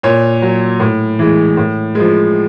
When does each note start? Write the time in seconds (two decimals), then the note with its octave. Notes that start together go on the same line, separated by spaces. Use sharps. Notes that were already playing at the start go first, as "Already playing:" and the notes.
0.03 A#2 C#5
0.42 F#3
0.80 A2
1.19 E3 G#3
1.57 A2
1.95 F3 G#3